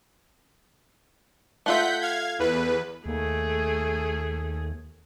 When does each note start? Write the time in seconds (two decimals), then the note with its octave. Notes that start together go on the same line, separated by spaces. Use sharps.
1.66 A3 F4 E5 F#5 G6 B6
2.01 F5 G#6
2.39 E2 B4
3.06 D#2 A3 G#4